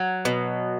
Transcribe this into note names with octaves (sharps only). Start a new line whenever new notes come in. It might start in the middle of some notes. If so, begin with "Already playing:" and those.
Already playing: F#3
B2